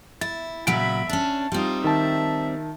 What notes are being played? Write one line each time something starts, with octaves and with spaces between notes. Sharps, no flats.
E4 A6
A#2 C#3 F#3 E5 B5 D7
C#4 D4 A5
G3 C4 D#4 F4
D#3 E5 A5